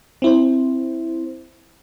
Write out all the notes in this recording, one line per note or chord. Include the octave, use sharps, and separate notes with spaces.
C4 E4 C5